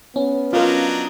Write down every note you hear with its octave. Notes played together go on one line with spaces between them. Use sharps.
B3 C#4
F#3 D4 D#4 F4 A#4